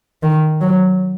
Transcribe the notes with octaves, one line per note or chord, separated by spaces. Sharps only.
D#3
F#3